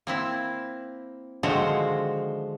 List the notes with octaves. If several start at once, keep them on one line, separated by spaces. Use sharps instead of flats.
A#3 C4 E4
D3 D#3 F3 G#3 F#4 C5